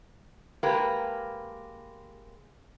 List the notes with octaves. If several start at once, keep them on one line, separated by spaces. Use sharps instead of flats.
G#3 A#3 G4 B4